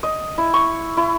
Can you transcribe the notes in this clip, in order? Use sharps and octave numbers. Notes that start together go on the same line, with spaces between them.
D#5
E4
C#6
E4